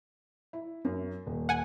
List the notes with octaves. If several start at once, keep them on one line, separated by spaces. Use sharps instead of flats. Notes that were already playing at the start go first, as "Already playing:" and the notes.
E4
F#2
D#1
F#5 G#5